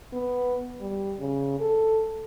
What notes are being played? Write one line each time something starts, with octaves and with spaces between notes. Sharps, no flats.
B3
G3
C#3
A4